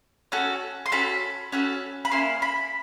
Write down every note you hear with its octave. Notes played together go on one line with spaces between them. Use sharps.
C#4 F#4 A4
C6
C#4 F#4 A4 B5
C#4 F#4 A4
B5
A#3 C#4 E4 C6
B5